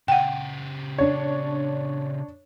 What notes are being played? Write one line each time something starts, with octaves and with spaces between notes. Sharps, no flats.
C#3 G4 F#5 G5
D4 C#5